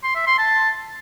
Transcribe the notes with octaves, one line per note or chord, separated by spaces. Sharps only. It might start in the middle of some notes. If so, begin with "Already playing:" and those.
C6
E5
C6
A5